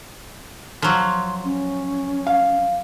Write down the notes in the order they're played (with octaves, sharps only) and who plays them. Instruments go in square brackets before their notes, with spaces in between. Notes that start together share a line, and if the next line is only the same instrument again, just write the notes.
[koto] F3 F#3 [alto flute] C6
[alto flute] C#4
[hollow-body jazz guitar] F5